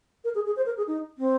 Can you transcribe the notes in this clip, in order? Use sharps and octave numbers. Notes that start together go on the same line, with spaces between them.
A#4
G#4
G#4
C5
A#4
G#4
D#4
C4